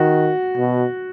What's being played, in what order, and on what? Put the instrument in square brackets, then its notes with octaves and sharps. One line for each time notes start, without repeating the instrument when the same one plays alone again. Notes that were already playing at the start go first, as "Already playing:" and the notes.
Already playing: [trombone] D#3 [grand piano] F#4
[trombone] B2